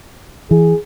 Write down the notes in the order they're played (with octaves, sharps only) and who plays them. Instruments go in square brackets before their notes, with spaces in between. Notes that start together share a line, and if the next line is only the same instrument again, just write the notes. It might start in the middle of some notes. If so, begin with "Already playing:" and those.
[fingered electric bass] E3 [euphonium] G#4